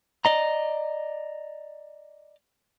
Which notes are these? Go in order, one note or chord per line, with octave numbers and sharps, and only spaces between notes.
D5 D#5 A#5